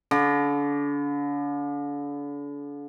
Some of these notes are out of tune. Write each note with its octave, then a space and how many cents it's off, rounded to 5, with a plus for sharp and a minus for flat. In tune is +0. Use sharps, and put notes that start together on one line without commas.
D3 -40 D6 +35